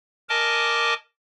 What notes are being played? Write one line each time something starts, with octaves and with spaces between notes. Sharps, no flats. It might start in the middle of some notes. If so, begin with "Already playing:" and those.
A#4 D#5 G#5 A5 D6